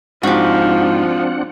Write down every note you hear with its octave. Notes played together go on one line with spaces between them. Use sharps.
G#2 F3 C4 D4 F#4 G4 F#5